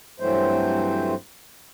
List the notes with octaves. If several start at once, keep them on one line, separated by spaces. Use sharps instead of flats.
G2 E3 F#3 A3 C4 C5